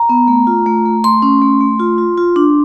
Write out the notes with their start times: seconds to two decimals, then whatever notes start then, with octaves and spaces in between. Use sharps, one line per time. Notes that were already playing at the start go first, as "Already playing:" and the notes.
Already playing: A#5
0.09 B3
0.28 A3
0.47 F4
0.66 A3
0.85 A3
1.04 A3 C6
1.22 C#4
1.42 A3
1.61 A3
1.80 F4
1.98 F4
2.18 F4
2.36 D4